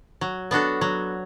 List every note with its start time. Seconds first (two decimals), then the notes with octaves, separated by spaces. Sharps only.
0.21 F#3
0.51 B3 D4 F#4 A4
0.81 F#3